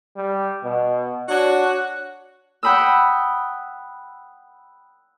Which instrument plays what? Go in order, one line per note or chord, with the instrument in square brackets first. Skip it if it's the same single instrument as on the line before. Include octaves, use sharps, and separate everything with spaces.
[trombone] G3
B2
[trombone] D4 [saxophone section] F#4 C#5
[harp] F#5 G5 B5 D#6 E6